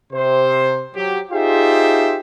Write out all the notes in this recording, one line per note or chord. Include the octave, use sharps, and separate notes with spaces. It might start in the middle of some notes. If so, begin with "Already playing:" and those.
C3 C5
F#3 G4
D#4 F4 G4 G#4 C5 E5